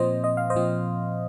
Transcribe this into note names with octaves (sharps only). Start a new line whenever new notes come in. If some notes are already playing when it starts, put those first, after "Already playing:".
Already playing: A#2 F3 C4 C5 D#5
D#5
F5
C5 D#5
A#2 F3 C4